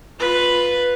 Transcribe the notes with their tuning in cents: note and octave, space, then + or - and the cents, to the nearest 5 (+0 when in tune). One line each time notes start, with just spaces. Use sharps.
F4 +10 B4 +0